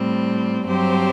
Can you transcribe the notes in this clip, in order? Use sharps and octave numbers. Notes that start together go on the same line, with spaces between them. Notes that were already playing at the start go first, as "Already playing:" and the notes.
Already playing: A2 G3 C4
G2 F#3 C4 G4 C5